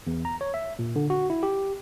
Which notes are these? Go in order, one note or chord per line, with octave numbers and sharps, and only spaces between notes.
E2
A#5
C#5
E5
A#2
D3
F#4
E4
G4